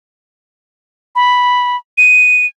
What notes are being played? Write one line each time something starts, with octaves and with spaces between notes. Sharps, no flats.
B5
D#7